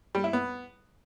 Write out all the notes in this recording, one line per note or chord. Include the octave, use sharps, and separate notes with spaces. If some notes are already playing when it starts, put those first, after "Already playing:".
G3
E4
B3